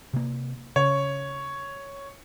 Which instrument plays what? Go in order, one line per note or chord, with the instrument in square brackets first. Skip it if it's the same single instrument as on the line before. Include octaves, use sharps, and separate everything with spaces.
[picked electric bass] C3 A#3
[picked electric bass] C#3 [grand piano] C#5